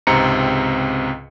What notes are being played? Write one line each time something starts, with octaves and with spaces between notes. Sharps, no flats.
C#2 G#2 C3 C4 A#5 C#7